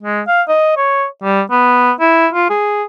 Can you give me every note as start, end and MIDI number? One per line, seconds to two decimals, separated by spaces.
0.03 0.21 56
0.27 0.42 77
0.48 0.74 75
0.77 1.06 73
1.23 1.41 55
1.51 1.92 59
2.00 2.27 64
2.33 2.50 65
2.50 2.83 68